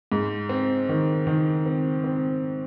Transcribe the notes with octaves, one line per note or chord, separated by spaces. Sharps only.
G#2
C4
D#3
D#3
C4
C4